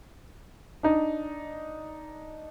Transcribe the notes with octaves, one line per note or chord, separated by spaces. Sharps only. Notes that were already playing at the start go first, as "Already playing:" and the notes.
D4 D#4